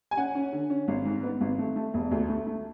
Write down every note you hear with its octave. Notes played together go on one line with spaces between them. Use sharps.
G#5
C#4 F#5
C#4
D3
C#4
G#1
G#2
B3
G#1
A3
A3
E1
D2
A3
A3